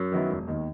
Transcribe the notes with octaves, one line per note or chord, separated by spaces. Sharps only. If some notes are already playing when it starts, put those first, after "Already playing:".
Already playing: F#2
D#3 F#3 B3 E4
E1
D#2 D#3